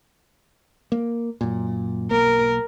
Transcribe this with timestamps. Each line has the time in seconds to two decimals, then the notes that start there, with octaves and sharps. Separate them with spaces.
0.92 A#3
1.41 F#2 A#2
2.11 B1 A#3 A#4